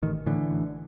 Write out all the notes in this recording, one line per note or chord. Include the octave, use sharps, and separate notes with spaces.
A1 D#3
A2 D3 E3
A1